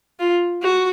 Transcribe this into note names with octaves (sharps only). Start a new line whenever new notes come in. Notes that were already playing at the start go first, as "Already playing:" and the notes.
F4
F#4